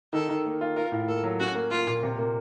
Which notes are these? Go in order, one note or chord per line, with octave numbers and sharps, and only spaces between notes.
D#3 A4
D#3
A#3
F4
F4 A#4
A2
A#3 A4
F#3
C#4 F#4
A#3
A#3 F4
A#2
C3
A#3